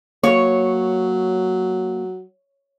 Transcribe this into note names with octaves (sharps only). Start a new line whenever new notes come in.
F#3 A#3 C#5